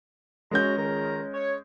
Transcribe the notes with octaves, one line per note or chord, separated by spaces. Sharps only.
F#2 G#3 C#4 F#4 A#5 G6
C#2 D#3 A#5
C#5